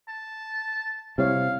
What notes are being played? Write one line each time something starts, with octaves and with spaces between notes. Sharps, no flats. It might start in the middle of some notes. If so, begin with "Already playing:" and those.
A5
C3 G3 E4 C#5 F5